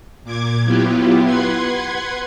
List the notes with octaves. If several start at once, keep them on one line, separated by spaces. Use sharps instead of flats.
A#2 D6 G#6
F#3 B3 E4 F4 G4
B4 F#5 C6 G#6